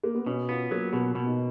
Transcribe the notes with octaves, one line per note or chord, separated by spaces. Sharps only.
A#3
B3
B2 C#4
B3 F4
F#3 A#3
B2 B3
B2
D#4